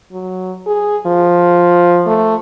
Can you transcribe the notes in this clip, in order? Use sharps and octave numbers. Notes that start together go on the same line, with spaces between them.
F#3
G#4
F3
A3